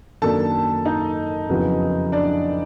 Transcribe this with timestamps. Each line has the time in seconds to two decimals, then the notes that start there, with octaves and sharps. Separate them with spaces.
0.22 F#2 D#3 F#3 A#3 D4 A4 A5
0.85 D#4 D#5
1.49 F2 C#3 F#3 B3 E4
2.12 D4 D5